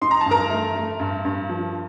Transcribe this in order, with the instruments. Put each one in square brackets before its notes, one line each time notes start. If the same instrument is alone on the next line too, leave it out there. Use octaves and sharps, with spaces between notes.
[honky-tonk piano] D#4 [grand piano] C6
[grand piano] A#5
A5
[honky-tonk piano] G2
[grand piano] A#4 A#5
[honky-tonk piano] A3
A3
G2
G2
F3